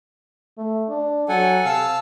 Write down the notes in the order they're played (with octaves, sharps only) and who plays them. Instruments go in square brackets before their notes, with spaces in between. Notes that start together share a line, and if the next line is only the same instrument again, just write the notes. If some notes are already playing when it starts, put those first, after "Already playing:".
[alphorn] A3
D4
[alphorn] F#3 [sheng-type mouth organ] A4 F#5 G#5
[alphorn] C3 [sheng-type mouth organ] F5 A5 E6